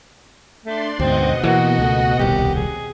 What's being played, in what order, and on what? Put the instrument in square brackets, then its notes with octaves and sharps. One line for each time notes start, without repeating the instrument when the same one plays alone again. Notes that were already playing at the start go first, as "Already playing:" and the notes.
[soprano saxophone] A3 [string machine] D4 D5 C6
[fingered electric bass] D2 G#2 [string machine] B2 D#5 F#5 [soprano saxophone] C4
[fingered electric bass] E3 A3 A#3 [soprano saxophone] F#4
[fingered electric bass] C#2 A3
[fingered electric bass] D#1 C2 [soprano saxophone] G4
[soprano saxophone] G#4